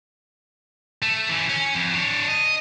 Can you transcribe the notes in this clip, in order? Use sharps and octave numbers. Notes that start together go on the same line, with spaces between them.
A3
E3 C#4
C#4
F2
D4 C#5
D#5